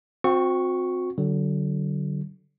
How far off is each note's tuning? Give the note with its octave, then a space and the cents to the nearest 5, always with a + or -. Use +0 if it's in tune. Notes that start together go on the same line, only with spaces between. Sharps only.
C4 +0 F#4 -35 C#6 +0
D3 +0 F#3 +35